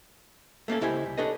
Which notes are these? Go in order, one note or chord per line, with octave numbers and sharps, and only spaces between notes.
A3 A#3 C#4 A4
C#2 E4 G4 C5 G#5
C2
D4 G4 A4 B4 C#5 D#5